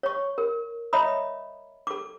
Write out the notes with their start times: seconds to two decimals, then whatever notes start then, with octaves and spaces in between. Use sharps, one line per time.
0.03 C#5 C#6
0.38 A#4
0.93 C#5 D#5 E5 A#5 B5 D#6
1.87 A4 D6